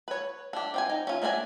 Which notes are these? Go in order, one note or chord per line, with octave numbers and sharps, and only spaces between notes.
B4 C#5
D4 G4
C4 G5 G#5
D#4
C#4 F4
A3 A#3 D4 D5 G#5